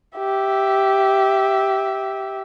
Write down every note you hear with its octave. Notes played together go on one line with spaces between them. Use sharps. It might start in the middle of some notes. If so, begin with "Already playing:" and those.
G4 E5